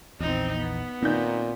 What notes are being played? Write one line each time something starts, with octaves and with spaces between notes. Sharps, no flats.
A#1 E2 C4 D#4
B3
A#2 D#3 C4 D#4 G6